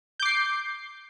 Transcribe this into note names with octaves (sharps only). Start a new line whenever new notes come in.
D6 G6 C7